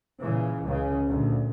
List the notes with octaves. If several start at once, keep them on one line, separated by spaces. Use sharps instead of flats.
A#2 C#3 E3
C#2 C#3
D2 A#2